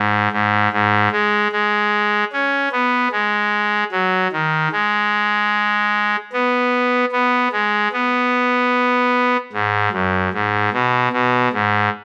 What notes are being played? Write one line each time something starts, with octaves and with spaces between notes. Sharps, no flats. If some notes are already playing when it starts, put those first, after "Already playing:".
Already playing: G#2
G#2
G#2
G#3
G#3
C#4
B3
G#3
F#3
D#3
G#3
B3
B3
G#3
B3
G#2
F#2
G#2
B2
B2
G#2